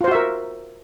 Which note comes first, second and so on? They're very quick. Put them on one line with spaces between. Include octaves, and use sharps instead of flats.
F4 C5 F#4 E5 A#4